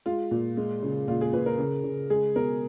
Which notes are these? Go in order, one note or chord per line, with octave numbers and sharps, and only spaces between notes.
G#3 F4
A#2
G#3
C#3
A#2 F4
G#4
A#2 B4
A#4
C#3
C#3
G#3 G#4
B2 A#4